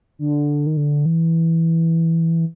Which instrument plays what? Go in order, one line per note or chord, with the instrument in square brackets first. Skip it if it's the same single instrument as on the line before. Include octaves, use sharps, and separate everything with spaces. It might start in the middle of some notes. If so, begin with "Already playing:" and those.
[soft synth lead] D3
D#3
D3
E3